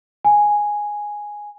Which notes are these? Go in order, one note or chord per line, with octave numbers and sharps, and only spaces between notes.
G#5